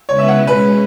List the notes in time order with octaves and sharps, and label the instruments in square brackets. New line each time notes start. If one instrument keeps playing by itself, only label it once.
[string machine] C#3 G#3 B3 E4 B4 [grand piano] C#5
[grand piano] E5
F#5
[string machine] B2 G#3 C#4
[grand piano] B4